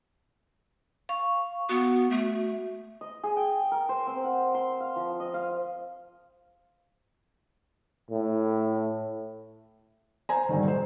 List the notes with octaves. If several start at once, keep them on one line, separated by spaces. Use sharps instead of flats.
F5 C#6
B3 F#4
A3
D#5
G#4
G5
A#4
C5
C4
F#5
C6
F5
F3
D#5
F5
A2
C5 G#5 A#5
G2 D3 D#3
B1 C5